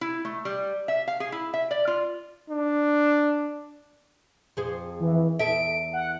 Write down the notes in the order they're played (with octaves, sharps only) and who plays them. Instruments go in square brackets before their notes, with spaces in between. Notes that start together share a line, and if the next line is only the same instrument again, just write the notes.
[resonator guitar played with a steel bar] E4
A3
G3
E5
F5
G#4
E4
E5
D5
F4
[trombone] D4
[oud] F2 G#4 C5
[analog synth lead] E3
[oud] E2 A4 E5 [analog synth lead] D7
[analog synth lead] F#5